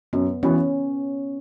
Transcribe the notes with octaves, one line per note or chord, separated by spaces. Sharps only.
F#2 B3
E3 B3 C#4 F#4 C#5